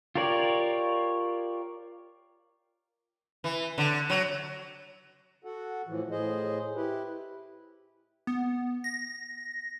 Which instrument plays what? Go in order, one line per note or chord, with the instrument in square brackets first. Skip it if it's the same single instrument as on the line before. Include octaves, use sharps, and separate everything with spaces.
[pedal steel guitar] F4 G4 A#4 C#5 D5
[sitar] E3
D3
F#3
[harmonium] F#4 A4 F#5
A2 E3 F3
A2 G#4 C5 D#5
E4 G4 B4
[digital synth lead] B3
A#6